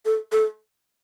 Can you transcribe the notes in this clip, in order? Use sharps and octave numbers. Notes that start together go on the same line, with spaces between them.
A4
A4